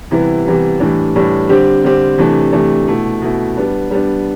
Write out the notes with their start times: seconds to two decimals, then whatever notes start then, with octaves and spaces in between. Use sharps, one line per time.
0.11 C3 E3 G3 B3 E4
0.45 C3 E3 G3 B3 E4
0.80 A2 E3 G3 D4
1.16 A2 E3 G3 D4
1.49 D3 G3 C4 G4
1.84 D3 G3 C4 G4
2.18 C3 E3 A3 D4
2.52 C3 E3 A3 D4
2.88 B2 A3 E4
3.21 B2 A3 E4
3.57 G3 B3 D4
3.90 G3 B3 D4